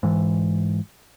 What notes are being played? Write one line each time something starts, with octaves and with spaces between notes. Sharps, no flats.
G#2 E3